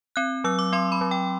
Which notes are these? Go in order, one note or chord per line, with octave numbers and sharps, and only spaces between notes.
C4 F#6
F#3 E6
D6
C4 C6
B5
F#3
G5